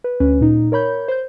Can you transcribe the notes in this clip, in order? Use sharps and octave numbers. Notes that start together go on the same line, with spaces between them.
B4
D2 C#4 B4
A#2 D#4
A#4 C#5 B5 G6
C5 G6